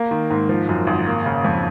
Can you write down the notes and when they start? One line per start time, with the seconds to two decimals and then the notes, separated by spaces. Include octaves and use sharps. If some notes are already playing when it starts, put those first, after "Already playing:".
Already playing: A#3
0.11 D#3
0.31 G#2
0.49 F3
0.69 F#2
0.87 G#1
1.07 A#3
1.26 C#3
1.45 F2